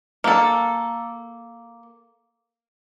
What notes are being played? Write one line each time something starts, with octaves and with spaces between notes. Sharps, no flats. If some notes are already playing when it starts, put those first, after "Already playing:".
A#3 A4